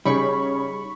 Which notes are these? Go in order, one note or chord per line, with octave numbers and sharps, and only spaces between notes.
C#3 G3 D#4 G#4 C#5 B5 C#6